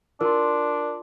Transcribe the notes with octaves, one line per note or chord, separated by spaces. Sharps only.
D4 F4 A#4 C6